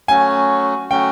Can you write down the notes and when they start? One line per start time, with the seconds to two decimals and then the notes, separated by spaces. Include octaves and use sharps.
0.08 F#3 A3 C#4 F#4 G#5
0.91 F#3 A3 C#4 F#4 G5